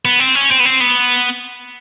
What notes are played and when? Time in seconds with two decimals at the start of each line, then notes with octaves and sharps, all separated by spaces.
0.05 B3
0.20 C4
0.35 C#4
0.51 C4
0.60 B3
0.65 C4
0.80 B3